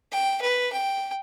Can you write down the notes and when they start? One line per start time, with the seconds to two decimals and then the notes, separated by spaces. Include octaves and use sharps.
0.12 G5
0.42 B4
0.72 G5